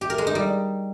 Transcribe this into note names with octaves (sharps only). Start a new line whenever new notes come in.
G4
A#4
G#3
D#4
G3